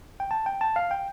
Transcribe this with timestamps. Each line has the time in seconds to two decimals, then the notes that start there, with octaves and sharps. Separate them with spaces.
0.20 G5
0.31 A5
0.46 G5
0.61 A5
0.76 F5
0.91 G5